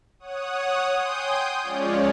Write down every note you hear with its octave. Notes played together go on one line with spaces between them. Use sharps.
C#5 F#5 D#6
G5 G#5 C6 D#6 G6
F3 G#3 C#4 F4 C#5 D5